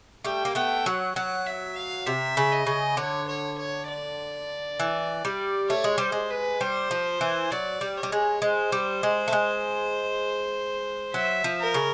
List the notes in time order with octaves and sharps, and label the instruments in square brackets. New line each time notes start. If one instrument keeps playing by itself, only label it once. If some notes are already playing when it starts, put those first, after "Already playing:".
[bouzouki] G3 A3 [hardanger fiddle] G5
[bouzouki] A#3
[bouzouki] A3 B3 [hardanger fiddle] G5
[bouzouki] F#3 [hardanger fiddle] F#5
[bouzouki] F#3 [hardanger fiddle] F#5
[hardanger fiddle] E5
F5
[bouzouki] C3 [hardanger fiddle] E5
[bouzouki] C#3
[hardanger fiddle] D#5
[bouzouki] C#3
[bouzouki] D3 [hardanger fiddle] C#5
[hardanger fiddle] C#5
C#5
D5
[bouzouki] E3
G3
[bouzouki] A3 [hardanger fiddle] C#5
[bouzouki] G#3
[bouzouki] G3 [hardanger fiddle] C5
[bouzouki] G#3
[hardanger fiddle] B4
[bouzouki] G3 [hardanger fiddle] C5
[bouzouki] F3
E3
[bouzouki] F#3 [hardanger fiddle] D5
[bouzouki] G3
[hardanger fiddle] C#5
[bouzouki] G3
G#3
[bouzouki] G#3 [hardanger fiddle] C5
[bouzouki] G3
G#3
A3
G#3
[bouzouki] F#3 [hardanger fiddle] E5
[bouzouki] F3
[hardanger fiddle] A#4
[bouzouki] C#3